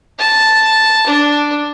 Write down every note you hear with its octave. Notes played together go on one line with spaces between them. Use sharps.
A5
D4